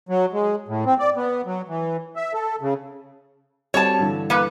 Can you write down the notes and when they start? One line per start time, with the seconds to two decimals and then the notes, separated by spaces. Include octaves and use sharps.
0.09 F#3
0.33 G#3
0.68 A2
0.86 C4
0.99 D5
1.16 B3
1.46 F#3
1.68 E3
2.16 E5
2.34 A4
2.61 C#3
3.74 G3 C4 F#4 C#5 A5
3.99 G2 D3 E3
4.30 A#3 B4